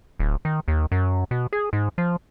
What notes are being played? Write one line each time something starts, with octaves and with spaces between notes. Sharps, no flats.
D1
D#3
D#2
F#2
B2
G#4
G#2
F3